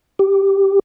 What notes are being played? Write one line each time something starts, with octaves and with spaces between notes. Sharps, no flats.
G4